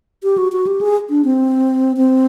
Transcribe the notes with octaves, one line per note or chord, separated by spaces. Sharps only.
G4
F#4
F#4
G4
G#4
D4
C4
C4